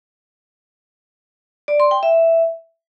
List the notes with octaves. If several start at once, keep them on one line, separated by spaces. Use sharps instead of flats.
D5
C6
G5
E5